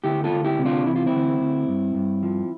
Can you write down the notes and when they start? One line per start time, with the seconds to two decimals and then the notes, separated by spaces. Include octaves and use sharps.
0.04 D2 E4 G4
0.24 F4 A4
0.32 D2
0.44 E4 G4
0.58 C3
0.65 D4 F4
0.86 E3 E4
0.96 F4
1.06 C4 E4
1.13 D2
1.40 D2
1.68 G2
1.95 G2
2.23 F3